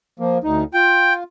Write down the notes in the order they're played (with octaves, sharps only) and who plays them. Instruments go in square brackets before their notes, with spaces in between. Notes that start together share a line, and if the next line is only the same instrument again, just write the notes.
[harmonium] F3 A#3
D2 D#4
[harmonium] F4 [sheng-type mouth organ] G5